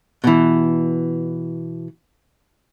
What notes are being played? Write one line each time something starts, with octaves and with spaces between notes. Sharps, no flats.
B2 E3